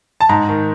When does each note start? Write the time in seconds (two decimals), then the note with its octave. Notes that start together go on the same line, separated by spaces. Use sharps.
0.21 A5
0.29 G#2 A#5
0.49 D#3